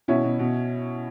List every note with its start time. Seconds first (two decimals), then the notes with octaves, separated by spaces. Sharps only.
0.08 B2 C#4 E4
0.24 B2
0.39 B2